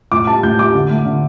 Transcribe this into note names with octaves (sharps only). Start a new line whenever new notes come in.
A2 D6
G3 A5
A2 G6
G3 D6
D3
A3
D3